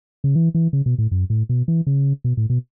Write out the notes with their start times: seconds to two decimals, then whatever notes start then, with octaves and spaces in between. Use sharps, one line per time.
0.24 C#3
0.36 E3
0.54 E3
0.73 C#3
0.86 B2
0.98 A2
1.11 F#2
1.30 A2
1.49 B2
1.68 E3
1.87 C#3
2.24 B2
2.37 A2
2.50 B2